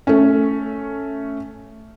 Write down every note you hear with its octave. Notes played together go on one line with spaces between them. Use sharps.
A3 C#4